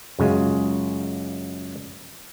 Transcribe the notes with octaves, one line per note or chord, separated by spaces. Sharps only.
F#2 C#3 G#3 F4